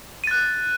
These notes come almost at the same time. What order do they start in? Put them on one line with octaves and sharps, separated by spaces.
D#7 A6 F#6